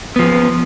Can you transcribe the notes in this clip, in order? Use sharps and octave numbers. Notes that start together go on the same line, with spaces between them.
F3 B3